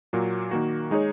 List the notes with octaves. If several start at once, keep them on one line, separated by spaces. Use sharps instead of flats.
A#2 F#3 A#3
D#3 A#3 F#4
G#3 D#4 G#4 C#5